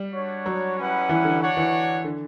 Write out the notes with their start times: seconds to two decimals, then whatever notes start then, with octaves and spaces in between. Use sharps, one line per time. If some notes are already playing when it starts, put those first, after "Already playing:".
Already playing: G3
0.14 D4 F#4 C#5
0.46 F#3
0.78 G3 C#4 E4 B4 F#5
1.09 E3
1.24 D3
1.41 D4 F#4 C#5 F#5
1.57 E3
2.04 D3